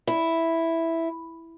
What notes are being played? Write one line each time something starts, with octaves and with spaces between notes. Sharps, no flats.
E4